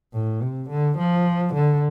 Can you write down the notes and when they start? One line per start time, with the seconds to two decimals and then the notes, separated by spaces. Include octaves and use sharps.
0.13 A2
0.42 C3
0.70 D3
0.98 F3
1.54 D3